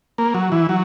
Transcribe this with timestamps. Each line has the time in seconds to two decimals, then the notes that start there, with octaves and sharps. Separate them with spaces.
0.18 A#3
0.34 F#3
0.52 E3
0.69 F#3